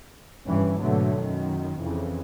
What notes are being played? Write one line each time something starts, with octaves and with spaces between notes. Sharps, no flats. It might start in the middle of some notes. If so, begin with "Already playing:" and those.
F1 G2 E3 C#4
G#2 B2 D3 F#3 A3
F#2 D#3
F2 C#3 E3